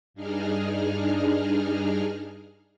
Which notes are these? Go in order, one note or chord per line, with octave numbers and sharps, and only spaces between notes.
G2 D4 D#4 G#4 F6